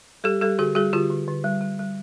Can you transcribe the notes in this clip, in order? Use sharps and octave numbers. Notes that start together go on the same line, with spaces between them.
G3 G4 A4
G3 G4 A4
D3 F#4 G#4
G3 F#4 G#4
D3 F4 G4
D3
D3
G3
G3
G3